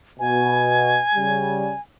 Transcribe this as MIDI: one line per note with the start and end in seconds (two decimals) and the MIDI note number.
0.19 0.98 47
0.19 1.80 80
1.15 1.72 49
1.15 1.72 55